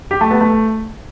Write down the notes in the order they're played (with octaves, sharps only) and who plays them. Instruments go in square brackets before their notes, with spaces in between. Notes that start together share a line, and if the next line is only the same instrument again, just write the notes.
[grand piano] G4
A3
B3
A3